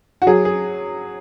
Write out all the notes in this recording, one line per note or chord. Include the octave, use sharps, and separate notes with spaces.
F#4
F#3 G#4
G#4